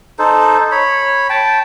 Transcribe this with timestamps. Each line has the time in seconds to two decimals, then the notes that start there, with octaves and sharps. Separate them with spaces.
0.19 D#4 A4 C5
0.71 C#5 B5
1.30 G5 A5